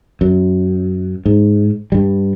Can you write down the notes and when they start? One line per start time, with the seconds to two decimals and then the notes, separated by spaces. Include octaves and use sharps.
0.21 F#2
1.26 G#2
1.92 G2 G3